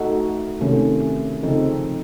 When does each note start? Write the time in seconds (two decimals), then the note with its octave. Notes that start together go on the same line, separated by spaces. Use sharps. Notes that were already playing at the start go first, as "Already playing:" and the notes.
Already playing: A3 D#4 F#4 A4
0.61 C3 D#3 A3 C#4
1.43 C#3 F3 C4 D#4 A4